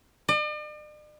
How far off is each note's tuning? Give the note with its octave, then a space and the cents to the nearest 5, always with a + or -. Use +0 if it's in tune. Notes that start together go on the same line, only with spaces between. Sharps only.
D5 +45